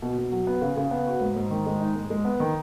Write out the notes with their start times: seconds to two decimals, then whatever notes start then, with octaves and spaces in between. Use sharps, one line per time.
0.02 B2
0.18 B2
0.32 F#3
0.47 B3
0.62 C#3
0.77 C#3
0.91 B3
1.07 F#4
1.21 G#2
1.36 G#2
1.50 D#3
1.66 G#3
1.81 D#4
1.95 G#2
2.10 G#3
2.25 B3
2.40 D#3